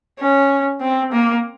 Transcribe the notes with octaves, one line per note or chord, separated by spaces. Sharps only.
C#4
C4
A#3